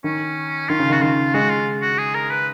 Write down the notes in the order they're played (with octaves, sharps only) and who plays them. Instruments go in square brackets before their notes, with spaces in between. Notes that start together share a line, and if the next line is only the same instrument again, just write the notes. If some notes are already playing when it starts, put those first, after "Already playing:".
[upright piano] D#3 [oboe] C#4
[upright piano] D#3 [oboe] F4
[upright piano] C#3
[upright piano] D#3 [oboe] F#4
[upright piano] D#3 [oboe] F4
[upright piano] G#3 [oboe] F#4
[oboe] F4
F#4
G#4
A#4
B4